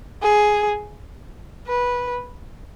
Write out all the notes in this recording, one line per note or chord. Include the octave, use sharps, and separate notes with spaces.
G#4
B4